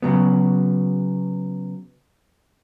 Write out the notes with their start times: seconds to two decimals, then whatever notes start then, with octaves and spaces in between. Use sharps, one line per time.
0.02 C#3 F#3 B3